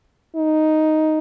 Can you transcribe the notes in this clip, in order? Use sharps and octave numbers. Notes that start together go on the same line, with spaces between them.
D#4